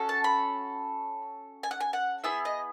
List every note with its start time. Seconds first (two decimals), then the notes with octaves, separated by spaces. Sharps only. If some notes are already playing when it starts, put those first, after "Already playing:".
Already playing: C#4 F#4 A4
0.09 A5
0.24 B5
1.63 G#5
1.71 F#5
1.80 G#5
1.93 F#5
2.24 B3 E4 G#4 E5
2.45 D#5